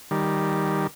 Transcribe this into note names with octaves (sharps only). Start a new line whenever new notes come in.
D#3 G3